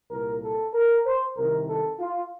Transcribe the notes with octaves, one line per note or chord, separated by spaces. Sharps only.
C2 A#2 A#4
A4
A#4
C5
C2 C3 D#3 A#4
A4
F4